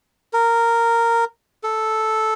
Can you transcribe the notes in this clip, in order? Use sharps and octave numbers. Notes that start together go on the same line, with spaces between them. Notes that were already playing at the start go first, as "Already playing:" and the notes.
A#4
A4